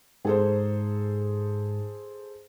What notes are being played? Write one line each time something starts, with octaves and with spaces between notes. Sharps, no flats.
G#2 G#4 A4 C5